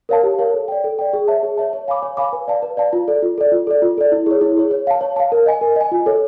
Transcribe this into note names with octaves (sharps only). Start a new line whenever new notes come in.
A#4 C#5 F5 A5
G4
A#4 C#5 F5 A5
A4
D5 G5
A4
D5 G5
G#4
C#5 E5 A5
G#4
C#5 E5 A5
C#5
F5 G#5 B5 D6
C#5
F5 G#5 B5 D6
B4
D5 F5 A5
B4
D5 F5 A5
F4
A4 D5
F4
A4 D5
F4
A4 D5
F4
A4 D5
E4
G#4 C#5
E4
G#4 C#5
C#5
F5 A5
C#5
F5 A5
A#4
D#5 G#5
A#4
D#5 G#5
F4
A4 C#5